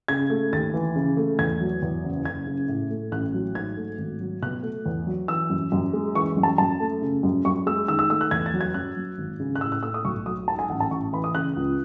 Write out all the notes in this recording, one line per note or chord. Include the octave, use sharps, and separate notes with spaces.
C#3 G#6
A3
D#2 A6
E3
C#3
A3
E2 G#6
F#3
E2
F#1
F#1 G#6
C#3
A2
A3
A1 F#6
F#3
G#2 G#6
A3
G#1
F#3
B2 F#6
A3
E2
F#3
E3 E6
F#2
F#2
G#3
E3 C#6
F#2
A5
F#2 A5
A3
C#3
F#2
F#2 C#6
G#3 E6
D#3 E6
E6
A3 E6
F#6
E2 G#6
A6
F#3
G#6
F#2 F#6
F#3
G#1
C#3
F#6
A2 E6
F#6
A3 E6
D#6
B1 C#6
F#3 D#6
G#2 A5
G#5
A1 F#5
A5
A1 C#6
E3 B5
D#6
C#3 F#6
C#2